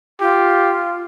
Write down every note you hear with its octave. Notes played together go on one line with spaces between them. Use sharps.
F4 G4